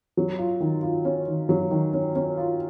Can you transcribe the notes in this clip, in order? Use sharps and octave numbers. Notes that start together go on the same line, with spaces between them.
F#3
F4
D#3
F4
C#4
D#3
F#3
D#3
C#4
C#4
F4